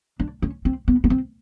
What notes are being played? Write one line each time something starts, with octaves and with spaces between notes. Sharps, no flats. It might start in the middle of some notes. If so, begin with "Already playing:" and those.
D4
C#4
C4
B3
B3
C4